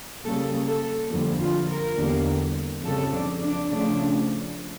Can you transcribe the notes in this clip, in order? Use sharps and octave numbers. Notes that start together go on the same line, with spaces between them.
C#3 G3 A#3 A4
A4
F2 D3 G3 A#3 A4
F4
A#4
E2 D3 G3 A#3
F2 C#3 G3 A4
D4
D4
C#3 F3 A3 D4